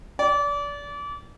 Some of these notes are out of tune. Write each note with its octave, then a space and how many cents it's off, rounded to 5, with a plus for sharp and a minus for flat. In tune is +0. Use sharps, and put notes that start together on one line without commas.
D5 -30